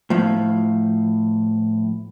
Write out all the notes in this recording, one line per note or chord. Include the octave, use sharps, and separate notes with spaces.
A2 F3